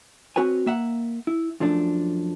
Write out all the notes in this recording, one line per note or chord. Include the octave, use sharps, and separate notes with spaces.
C4 F#4 B4 C#5 G#5
A#3 E5 F#5
E4
F#2 F3 A3 D4